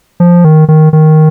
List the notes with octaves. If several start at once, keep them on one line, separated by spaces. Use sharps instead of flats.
F3
D#3
D#3
D#3